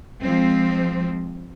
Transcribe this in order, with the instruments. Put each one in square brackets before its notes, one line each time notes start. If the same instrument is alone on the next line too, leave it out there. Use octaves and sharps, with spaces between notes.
[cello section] F3 G#3 C4